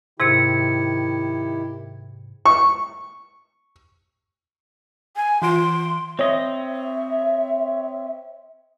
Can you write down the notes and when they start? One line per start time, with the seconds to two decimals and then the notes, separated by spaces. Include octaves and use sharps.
0.20 G#2 C3 D#3 E4 G4 G#6 C#7
2.46 C#6
5.16 G#5
5.42 E3 F4 C6 D7
6.19 C4 C#5 D#5 E5